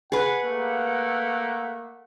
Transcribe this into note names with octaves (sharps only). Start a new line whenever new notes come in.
G#4 B4 F#5
A3 A#3